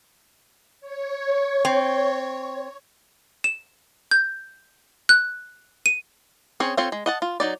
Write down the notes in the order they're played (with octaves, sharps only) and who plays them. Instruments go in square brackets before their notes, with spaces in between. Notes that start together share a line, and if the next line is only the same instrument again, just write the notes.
[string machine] C#5
[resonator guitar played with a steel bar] C4
[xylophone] E7
G6
F#6
D#7
[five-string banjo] C4 C#4 G#4 C#5
C4 F4 A4 C5 C#5
G#3
D#5 F#5 A5
F4
F#3 D#4 D5